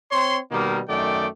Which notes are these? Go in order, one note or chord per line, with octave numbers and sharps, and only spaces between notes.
C4 C#5 C6
B2 D#3 G3 A#3
F#2 D#3 A3 D5 G5